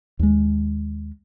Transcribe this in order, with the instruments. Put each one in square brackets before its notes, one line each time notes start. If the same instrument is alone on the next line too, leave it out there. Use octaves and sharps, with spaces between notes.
[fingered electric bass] D#2 G#3